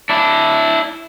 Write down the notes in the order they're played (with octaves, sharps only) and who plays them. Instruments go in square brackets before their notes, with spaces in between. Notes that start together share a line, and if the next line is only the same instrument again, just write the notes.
[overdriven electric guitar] D4 E4